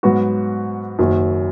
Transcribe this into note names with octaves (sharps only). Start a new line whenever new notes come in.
G#2 F#3 B3 F#4
F#1 F#2 D#3 F#3